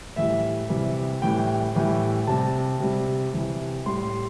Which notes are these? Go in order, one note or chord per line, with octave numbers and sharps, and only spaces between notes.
A2 E3 G3 E5
C3 E3 G3
A2 E3 G3 G5
A2 E3 G3
C3 G3 A5
C3 G3
C3 E3 G3
A2 G3 C6